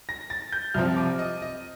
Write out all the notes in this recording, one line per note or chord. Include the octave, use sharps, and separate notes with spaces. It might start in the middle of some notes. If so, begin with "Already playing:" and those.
A#6
A6
G6
C2 C3 F3 C4 F6
D6
D#5
D#5